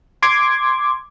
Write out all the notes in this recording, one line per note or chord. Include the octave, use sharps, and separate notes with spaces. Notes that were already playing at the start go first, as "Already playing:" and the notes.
C6 D6 G#6